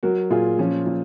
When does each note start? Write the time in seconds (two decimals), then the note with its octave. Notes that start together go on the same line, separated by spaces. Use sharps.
0.03 F#3 F#4 A#4
0.30 A#2 F4 G#4
0.59 F3 C#4 F4
0.86 A#2